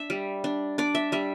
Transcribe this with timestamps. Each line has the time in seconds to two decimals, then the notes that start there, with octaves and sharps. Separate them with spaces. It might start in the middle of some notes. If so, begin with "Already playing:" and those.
Already playing: D4 E5
0.10 G3
0.44 D4
0.78 D4 D5
0.95 E5
1.12 G3 E5